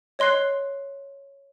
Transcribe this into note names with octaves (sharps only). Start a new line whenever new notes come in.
C#5 D#5 C6 F#6 C7